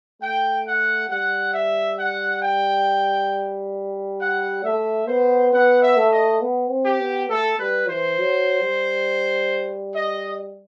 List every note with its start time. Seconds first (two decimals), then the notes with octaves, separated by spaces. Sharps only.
0.21 A3 G5
0.66 F#5
1.09 G3 F#5
1.53 E5
1.98 F#5
2.42 G5
4.20 F#5
4.64 A3 E5
5.08 B3 C5
5.53 B3 F#5
5.82 E5
5.97 A3
6.11 D#5
6.41 B3
6.70 C4
6.85 G4
7.00 B3
7.29 A3 A4
7.59 G3 B4
7.88 E3 C5
8.18 F#3
8.62 G3
9.95 D#5